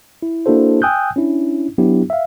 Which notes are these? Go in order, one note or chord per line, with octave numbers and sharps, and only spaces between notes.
E4
A#3 D4 E4 F#4 A4 C5
G5 G#5 D#6 E6 F#6 G6
C#4 D4 E4
F#3 B3 D4 E4 G4
E5 F5